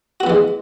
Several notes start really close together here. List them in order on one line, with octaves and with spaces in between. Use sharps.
F#4 B3 E3 G#3